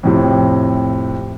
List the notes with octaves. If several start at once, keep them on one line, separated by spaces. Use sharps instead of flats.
F2 A2 C3